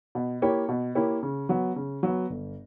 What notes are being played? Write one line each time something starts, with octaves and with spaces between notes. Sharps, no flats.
B2
A#3 E4 G4 C#5
B2
A#3 E4 G4 C#5
C#3
F#3 B3
C#3
F#3 B3
G1